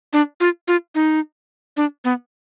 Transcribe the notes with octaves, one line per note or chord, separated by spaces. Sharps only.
D4
F4
F4
D#4
D4
B3